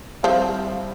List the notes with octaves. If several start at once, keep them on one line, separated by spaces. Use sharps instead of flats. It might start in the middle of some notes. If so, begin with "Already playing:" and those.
F3 G3 C4 E4